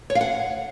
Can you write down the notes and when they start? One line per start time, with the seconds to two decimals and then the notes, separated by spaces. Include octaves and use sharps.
0.10 C#5
0.15 F5
0.21 F#5